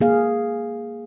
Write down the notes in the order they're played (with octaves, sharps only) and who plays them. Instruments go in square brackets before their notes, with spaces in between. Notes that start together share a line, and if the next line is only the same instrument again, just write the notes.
[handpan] A#3 G#4 F5